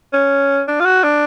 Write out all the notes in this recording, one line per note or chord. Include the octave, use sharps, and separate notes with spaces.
C#4
D4
F4
F#4
D4